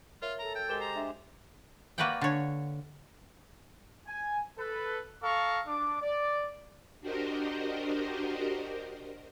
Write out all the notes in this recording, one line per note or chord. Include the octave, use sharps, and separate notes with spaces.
F4 A#4 C#5 E5
A4 A#5
F#2 G5 E6
G#3 G4 A#4 C5 E7 G7
A#5 C7
D4 E5
A#3 F#4 B4 D5 F#5 G5
D3 C#5
G#5
A4 B4
A4 F5 A#5 C#6
D4 D6
D5
D4 F#4 G4 A#4 C5 D#5